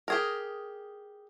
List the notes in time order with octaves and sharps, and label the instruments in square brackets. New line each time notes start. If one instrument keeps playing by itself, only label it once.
[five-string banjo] G4 G#4 A#4